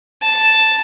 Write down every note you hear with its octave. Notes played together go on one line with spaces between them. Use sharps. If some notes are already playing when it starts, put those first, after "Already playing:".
A5